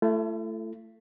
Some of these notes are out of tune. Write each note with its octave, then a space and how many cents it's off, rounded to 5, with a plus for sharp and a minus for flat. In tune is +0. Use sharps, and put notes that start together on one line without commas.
A3 +5 E4 +45